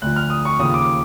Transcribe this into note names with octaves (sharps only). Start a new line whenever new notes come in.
D2 D3 F3 F#6
F6
D#6
C#6
D#2 C#3 F3 D#6
D6